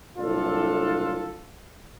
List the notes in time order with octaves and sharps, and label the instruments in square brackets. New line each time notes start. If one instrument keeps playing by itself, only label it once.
[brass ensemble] F#1 C2 A2 D4 F4 A4